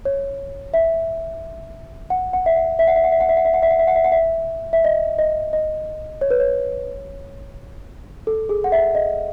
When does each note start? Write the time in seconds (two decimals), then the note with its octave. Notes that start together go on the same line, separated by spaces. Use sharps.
0.05 C#5
0.74 E5
2.10 F#5
2.33 F#5
2.46 E5
2.56 F#5
2.79 E5
2.88 F#5
2.96 E5
3.04 F#5
3.12 E5
3.20 F#5
3.29 E5
3.37 F#5
3.45 E5
3.54 F#5
3.63 E5
3.70 F#5
3.79 E5
3.87 F#5
3.95 E5
4.04 F#5
4.12 E5
4.73 E5
4.84 D#5
5.18 D#5
5.53 D#5
6.21 C#5
6.31 B4
6.40 C#5
8.27 A4
8.49 G#4
8.64 F#5
8.72 E5
8.95 D#5